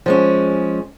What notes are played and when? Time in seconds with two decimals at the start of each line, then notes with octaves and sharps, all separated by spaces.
0.06 F3 G#3 C#4